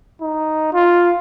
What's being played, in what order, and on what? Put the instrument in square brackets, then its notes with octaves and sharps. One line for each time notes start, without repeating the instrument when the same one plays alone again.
[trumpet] D#4
F4